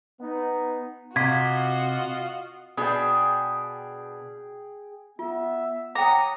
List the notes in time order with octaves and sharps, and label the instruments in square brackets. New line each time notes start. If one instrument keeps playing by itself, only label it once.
[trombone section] B3 D#4
[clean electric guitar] C3 [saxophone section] F4 D#5 F5 [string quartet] F#4 [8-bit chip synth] G#6 B6
[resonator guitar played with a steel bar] B2 D4 [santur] G#4 G5
[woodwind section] B3 E5 [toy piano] F4
[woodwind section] C#5 F#5 D#6 [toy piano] G5 D6 [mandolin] A#5